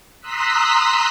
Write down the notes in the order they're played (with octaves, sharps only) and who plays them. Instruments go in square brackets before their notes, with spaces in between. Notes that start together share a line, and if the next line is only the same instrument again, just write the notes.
[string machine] A#5 C6 D#6 E6 F#6 B6